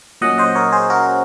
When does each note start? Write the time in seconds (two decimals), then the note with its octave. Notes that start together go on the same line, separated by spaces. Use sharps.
0.21 A#2 F#3 C#4 D#5 F#5
0.38 C5 D#5
0.55 A#4 C#5
0.72 G#4 C5
0.90 F#4 A#4